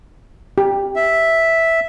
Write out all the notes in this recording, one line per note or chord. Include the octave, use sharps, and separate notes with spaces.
G4
E5